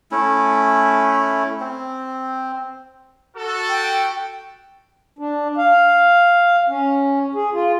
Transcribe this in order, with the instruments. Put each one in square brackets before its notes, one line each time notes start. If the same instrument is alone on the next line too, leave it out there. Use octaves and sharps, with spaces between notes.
[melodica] A3 C#4 E4
C4
[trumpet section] F#4 A4
[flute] G5
[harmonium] D4
F5
C#4
G#4
F4